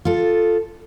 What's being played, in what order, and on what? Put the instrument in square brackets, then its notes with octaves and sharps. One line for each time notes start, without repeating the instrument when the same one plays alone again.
[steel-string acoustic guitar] F4 A4